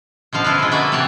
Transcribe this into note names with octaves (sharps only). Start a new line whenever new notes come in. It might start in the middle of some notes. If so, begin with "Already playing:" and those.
B2 D3 F3 F5
E4 F4 A4 B4
D3 G#3
A#3 F#4 B4 D5 E5
C3 E3 C#5 D5 A5